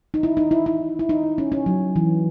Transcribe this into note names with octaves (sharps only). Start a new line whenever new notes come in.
D#4
E4
D#4
E4
E4
E4
D#4
C#4
C#4
F#3
E3